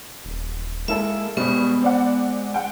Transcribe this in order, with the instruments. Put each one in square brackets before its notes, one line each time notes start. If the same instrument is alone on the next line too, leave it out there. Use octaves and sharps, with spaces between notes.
[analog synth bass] D#1
[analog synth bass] G#3 [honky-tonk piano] A#3 E4 A4 [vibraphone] E5
[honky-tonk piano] B2 G3 C4 [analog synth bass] G#3 [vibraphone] B3
[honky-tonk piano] C4 D5 F#5
F#5 G5